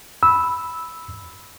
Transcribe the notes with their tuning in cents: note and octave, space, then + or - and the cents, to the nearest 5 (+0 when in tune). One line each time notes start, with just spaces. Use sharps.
B5 +0 E6 -10